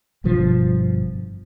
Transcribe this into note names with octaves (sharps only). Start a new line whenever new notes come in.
G1 G2 B2 F3